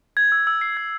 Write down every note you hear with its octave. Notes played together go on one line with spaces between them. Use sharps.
G#6
E6
E6
C7
G#6